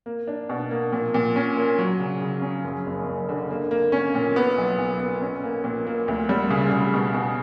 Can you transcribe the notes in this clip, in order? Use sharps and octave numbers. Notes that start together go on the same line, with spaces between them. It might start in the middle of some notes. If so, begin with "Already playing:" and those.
A#3
D4
B2
A#3
A#2
A#2
C#4
A#3
F#3
C#3
C#3
C#4
F#2
F#1
F#1
D3
A#3
A#3
C#4
A#2
B3
B1
B1
B3
C#4
A#3
A#2
A#3
D2
G3
C#3
C#3
B2
B2